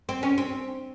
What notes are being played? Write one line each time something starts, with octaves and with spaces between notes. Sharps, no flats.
C4
C#4
C4